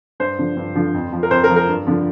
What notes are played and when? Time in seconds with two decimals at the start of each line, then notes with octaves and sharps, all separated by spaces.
0.20 G2 C5
0.38 D3 F3
0.57 G2
0.75 D3 F3
0.94 F2
1.13 F3
1.23 A#4
1.31 F2 C5
1.44 A#4
1.49 F3
1.56 A#4
1.69 G2
1.87 D3 F3